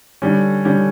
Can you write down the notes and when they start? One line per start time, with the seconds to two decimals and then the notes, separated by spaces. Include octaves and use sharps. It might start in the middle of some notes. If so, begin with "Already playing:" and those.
0.22 D3 G3 C#4
0.65 D3 G3 C#4